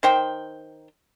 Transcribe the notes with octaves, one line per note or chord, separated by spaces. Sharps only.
D#3 C5 G5